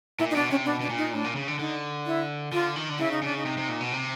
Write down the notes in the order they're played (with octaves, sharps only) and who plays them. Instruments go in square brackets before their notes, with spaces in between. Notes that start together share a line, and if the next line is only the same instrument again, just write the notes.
[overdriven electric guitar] A#2 [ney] E4
[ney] D#4
[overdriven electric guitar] B2 [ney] D4
[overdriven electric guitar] C3 [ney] C#4
[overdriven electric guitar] B2 [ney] D4
[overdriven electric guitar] B2 [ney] D4
[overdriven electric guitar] A#2
[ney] D#4
[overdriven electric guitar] A2 [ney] D4
[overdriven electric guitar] A#2
C#3
D3
[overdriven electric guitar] D3 [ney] D#4
[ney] E4
[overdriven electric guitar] D3 [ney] F4
[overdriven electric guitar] D#3
D3
[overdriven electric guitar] C#3 [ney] E4
[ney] D#4
[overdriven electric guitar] C#3 [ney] D4
[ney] D#4
[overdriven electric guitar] C3
C3
A#2
B2
C3